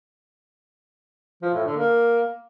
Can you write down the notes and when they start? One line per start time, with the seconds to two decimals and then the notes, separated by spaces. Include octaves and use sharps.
1.42 F3
1.54 A2
1.65 D3
1.77 A#3